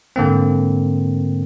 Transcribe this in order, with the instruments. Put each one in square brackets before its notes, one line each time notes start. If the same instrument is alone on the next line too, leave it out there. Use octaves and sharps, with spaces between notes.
[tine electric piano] G#2 D3 A#3 C4